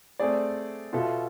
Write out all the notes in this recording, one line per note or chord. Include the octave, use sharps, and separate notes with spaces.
A3 C4 G#4 D5
B2 B3 F4 A4 E5